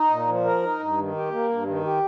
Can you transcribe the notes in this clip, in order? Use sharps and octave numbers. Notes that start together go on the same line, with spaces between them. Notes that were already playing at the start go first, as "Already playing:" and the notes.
Already playing: D#4
A#2
F3
A#4
D#4
G2
D#3
G4
A#3
G2
D#3
G4